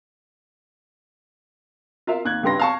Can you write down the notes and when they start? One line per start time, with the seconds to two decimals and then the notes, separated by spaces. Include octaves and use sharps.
2.07 F4 A#4 E5 F5
2.25 D#2 F#6 G#6
2.43 C#2 G2 G4 B4 C6 A#6
2.60 F5 A5 C#6